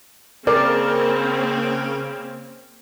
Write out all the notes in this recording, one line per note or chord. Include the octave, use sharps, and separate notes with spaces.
C#3 A#3 C4 C#4 A#4 D5